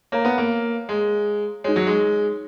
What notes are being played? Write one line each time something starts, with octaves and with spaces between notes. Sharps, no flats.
A#3 C#5 F5 A#5
B3
A#3
G#3
G#3 D#4 F#4 C#5
F#3
G#3